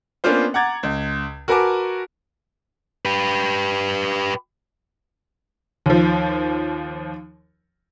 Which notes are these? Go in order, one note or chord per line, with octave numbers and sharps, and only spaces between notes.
A#3 B3 C#4 D4 F4 C5
F#5 A#5 D6 G#6 A6
C#2
F#4 A#4 B4 G#5 A5 D6
G4 B4
D#2 F3